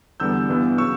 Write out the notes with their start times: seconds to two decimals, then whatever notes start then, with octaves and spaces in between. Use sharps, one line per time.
0.20 E2 D3 G3 B3 E6 G6
0.49 G2 E3 B3
0.78 C#3 F#3 C#6 E6